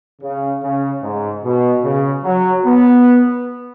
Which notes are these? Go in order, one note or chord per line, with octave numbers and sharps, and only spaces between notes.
C#3
C#3
G#2
B2
C#3
F#3
B3